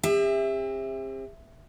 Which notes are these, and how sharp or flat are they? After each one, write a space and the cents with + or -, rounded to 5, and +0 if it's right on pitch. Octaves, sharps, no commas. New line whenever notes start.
C4 +35 G4 +45 E5 +0